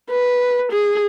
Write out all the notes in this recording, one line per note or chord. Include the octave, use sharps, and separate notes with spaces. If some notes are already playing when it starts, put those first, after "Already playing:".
B4
G#4